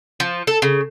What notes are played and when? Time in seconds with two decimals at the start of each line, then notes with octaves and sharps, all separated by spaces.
0.20 F3
0.47 A4
0.62 C#3